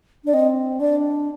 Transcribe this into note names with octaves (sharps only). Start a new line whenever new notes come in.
D4 D5
C4 D#5
D4 D5